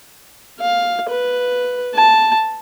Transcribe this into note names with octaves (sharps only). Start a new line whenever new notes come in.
F5
B4
A5